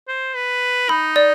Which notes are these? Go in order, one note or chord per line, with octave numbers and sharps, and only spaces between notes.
C5
B4
D#4 B5
D5